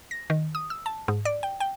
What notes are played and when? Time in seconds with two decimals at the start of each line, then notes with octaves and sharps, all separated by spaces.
0.11 A#6
0.30 D#3
0.55 D#6
0.70 E6
0.86 A5
1.08 G#2
1.25 D5
1.43 G5
1.60 G5